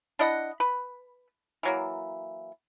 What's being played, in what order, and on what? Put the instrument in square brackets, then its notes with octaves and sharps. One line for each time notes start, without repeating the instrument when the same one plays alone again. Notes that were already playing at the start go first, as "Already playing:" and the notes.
[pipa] D4 E4 D#5 F#5
B4
E3 F#3 A#3